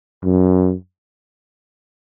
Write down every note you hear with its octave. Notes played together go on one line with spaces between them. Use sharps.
F#2